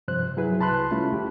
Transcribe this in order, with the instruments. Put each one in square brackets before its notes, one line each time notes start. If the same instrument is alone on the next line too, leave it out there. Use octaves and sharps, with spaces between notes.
[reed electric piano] G2 C3 F3 C5 F#6
F#3 E4 G#4 B4
C2 C3 A5 B5 C6 F#6
G3 A3 C#4 E4 F4
D#2 G4